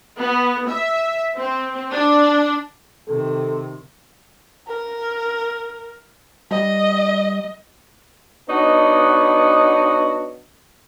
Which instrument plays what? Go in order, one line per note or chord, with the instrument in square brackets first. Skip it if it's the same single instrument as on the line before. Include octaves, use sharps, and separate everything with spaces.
[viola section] B3
E5
C4
D4
[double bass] C3 D#3 [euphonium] A4
[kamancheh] A#4
[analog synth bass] G3 [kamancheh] D#5
[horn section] B3 D4 D#4 F#4 C#5 D#5